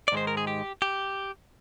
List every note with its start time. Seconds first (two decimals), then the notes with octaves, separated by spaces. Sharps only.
0.08 D5
0.12 G#2 D#3 G#3 C5
0.27 A#4
0.37 G#4
0.47 G4
0.82 G4